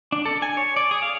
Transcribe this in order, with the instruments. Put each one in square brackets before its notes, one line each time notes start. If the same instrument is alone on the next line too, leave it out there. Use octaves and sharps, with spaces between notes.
[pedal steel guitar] D4
A4
G#5
C#5
D5
G#4
F5